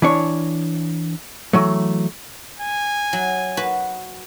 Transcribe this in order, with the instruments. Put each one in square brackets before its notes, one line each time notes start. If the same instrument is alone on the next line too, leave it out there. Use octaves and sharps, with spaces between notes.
[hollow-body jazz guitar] E3 D4 C#5
E3 F#3 A3
[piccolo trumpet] G#5
[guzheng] F#3
F#4 B4